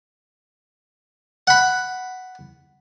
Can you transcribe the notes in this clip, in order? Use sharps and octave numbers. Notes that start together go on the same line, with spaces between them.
F#5 B5